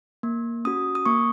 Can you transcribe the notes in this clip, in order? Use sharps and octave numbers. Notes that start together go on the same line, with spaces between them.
A#3
C#4 F#4 D#6
D#6
A#3 C#6